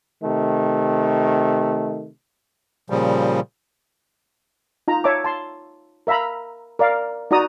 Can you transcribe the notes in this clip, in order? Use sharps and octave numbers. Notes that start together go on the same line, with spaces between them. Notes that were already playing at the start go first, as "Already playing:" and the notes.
C3 D#3 A3
A#2 C#3 F3 G3
D#4 F4 A#5
C#5 E5 A5 D6
A5 C6
A#4 E5 F5 A#5 B5
A#4 D5 F5
D#4 F#4 D5 A#5 D#6